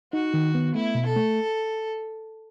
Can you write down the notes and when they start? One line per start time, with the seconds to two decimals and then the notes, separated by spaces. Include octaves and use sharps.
0.13 D#4 F#4
0.34 D#3
0.55 B3
0.75 A3 E4
0.95 B2
1.06 A4
1.16 A3